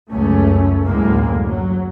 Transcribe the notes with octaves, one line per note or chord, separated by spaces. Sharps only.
C#2 F#2 A3 C#4
F#1 D2 A2 G#3 A#3
F#3